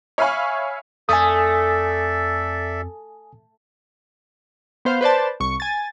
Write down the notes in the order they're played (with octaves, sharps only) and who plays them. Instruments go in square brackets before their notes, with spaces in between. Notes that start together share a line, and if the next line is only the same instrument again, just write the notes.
[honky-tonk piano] C#5 E5 F5 G#5 B5 C#6
[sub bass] F2 [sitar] A3 [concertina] A4 D5 E5 [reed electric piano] G#5 D#6
[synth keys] B3 C5 F5
B4 C5 D5 A5
C2 C#6
G#5 A6